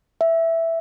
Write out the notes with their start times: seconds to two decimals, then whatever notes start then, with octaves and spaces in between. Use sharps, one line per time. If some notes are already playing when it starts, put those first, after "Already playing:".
0.21 E5